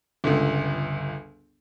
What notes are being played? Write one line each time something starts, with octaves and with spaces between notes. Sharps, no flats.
G1 C#2